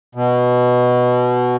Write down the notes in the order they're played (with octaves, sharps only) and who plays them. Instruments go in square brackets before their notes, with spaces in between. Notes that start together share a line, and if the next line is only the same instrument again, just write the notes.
[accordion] B2